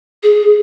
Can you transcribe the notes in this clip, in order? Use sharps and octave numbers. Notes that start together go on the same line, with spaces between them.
G#4